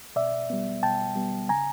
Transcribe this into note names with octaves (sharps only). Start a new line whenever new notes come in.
B2 D5 E5
G3 B3
B2 G5 A5
G3 B3
C#3 G#5 A#5